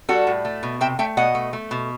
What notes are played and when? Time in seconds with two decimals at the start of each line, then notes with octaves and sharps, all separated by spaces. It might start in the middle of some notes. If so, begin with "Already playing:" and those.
0.09 G3 F#4 A4
0.27 A2
0.45 A3
0.63 B2
0.81 C3 E5 G5
0.99 A3 E5 G5
1.17 B2 D#5 F#5
1.35 A3
1.53 A3
1.71 B2